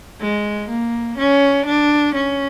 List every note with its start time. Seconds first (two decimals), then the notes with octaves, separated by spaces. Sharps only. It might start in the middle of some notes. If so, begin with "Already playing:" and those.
0.21 G#3
0.69 A#3
1.18 C#4
1.66 D4
2.15 C#4